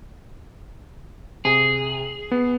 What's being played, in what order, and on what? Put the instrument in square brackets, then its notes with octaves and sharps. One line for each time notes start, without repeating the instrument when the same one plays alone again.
[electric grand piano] C3 [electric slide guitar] G#4
[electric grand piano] B3